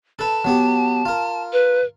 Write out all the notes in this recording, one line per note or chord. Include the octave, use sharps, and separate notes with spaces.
A4 B4 A5
F#3 B3 G4
F4 A#4
B4